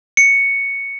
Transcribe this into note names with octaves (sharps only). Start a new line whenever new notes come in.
C#7